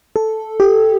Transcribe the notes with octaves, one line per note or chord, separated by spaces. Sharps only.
A4
G4